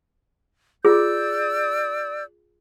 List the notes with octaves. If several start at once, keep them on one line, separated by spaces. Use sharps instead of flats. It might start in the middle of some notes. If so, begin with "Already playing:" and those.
F4 G#4 D5 E6 G6